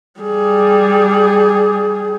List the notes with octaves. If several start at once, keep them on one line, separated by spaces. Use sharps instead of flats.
G3 G#4